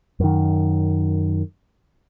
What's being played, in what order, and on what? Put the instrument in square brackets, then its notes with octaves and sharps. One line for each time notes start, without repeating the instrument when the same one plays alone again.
[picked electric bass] F#2 D#3